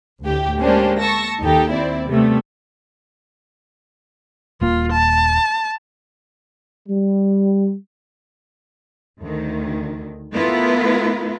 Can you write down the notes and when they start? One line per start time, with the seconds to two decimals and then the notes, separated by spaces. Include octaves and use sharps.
0.23 D2 A2 G4
0.60 G#3 A#3 C#4 D4 G4 C5
1.01 A5 C#6 E6 A#6
1.42 D#2 D#4 G4 A4
1.72 C4 E4 D5
2.07 C3 G3 A3 B3
4.61 D#1 A#3 F4
4.92 A5
6.87 G3
9.22 D2 D#3
10.33 A3 B3 E4 F4 A#4 B4